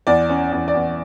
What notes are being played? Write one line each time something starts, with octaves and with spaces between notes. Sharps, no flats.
E2 D5
C#4
E2
D5
E2